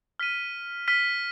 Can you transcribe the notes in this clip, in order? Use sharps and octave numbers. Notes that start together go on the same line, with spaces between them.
F6 B6 D#7
F6 B6 D#7